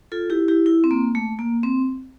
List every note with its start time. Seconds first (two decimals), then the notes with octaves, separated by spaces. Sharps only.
0.12 F4 A4
0.30 E4 G4
0.48 E4 G4
0.66 E4
0.84 C4
0.91 A#3
1.15 A3
1.39 A#3
1.63 C4